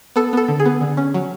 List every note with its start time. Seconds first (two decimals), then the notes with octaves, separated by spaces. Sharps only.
0.16 B3 A4
0.33 B3 A4
0.48 D3
0.60 G#4
0.66 B3
0.81 D3
0.97 C#4
1.14 F#3